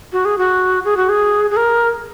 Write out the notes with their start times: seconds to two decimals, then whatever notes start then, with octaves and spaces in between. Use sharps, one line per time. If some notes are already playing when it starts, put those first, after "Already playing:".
0.12 F#4
0.25 G#4
0.38 F#4
0.85 G#4
0.97 F#4
1.09 G#4
1.51 G#4
1.57 A#4